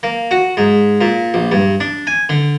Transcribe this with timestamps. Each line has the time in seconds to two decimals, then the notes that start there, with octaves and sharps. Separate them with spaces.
0.03 A#3
0.31 F#4
0.57 G#2
1.01 A#2
1.34 A#1
1.51 G2
1.80 D4
2.07 G#5
2.29 D3